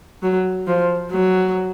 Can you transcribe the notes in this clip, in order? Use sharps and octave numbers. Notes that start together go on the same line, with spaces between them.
F#3
F3
F#3